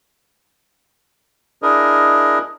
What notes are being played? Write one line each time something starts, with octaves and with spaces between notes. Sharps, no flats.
D4 E4 G#4 A#4 D#5